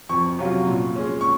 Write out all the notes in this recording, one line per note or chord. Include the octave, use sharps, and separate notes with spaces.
F2 C#6
C3 F#3 C#4 F4
A#2
G#3 C#4
C#6